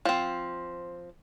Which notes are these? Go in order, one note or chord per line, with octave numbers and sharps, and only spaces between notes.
F3 C4